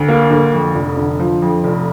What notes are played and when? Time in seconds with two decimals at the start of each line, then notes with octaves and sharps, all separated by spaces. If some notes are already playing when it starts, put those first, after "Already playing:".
Already playing: D2
0.08 A#3
0.30 D2
0.53 F2
0.75 F1
0.97 D3
1.20 F3
1.42 F2
1.64 F1